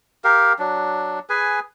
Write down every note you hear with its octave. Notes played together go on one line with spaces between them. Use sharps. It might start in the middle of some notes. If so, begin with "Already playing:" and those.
G4 A#4 F5
F#3 D4
G#4 B4 G#5